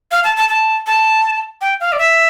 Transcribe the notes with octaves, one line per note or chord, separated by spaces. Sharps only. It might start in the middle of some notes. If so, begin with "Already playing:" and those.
F5
A5
A5
A5
A5
G5
F5
D5
E5